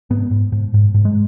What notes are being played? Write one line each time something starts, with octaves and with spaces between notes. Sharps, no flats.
G#2 B3
G#2
G#2
G#2
G#2
G#3